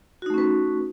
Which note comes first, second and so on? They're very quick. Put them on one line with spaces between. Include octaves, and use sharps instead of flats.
F#4 D#4 A3 C#4 B4